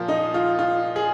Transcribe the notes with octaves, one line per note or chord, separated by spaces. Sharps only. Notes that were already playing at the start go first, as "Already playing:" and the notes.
Already playing: A#2 F3 A#3 F4
D#4
F4
F4
G#4